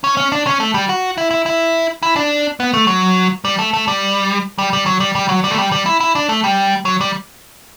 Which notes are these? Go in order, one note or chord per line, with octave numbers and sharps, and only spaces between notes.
C#4
C#4
D4
C#4
A3
G3
F#4
E4
E4
E4
E4
D4
B3
A3
F#3
G3
A3
A3
G3
G3
G3
F#3
G3
G3
F#3
G3
A3
G3
G3
E4
E4
D4
A3
G3
F#3
G3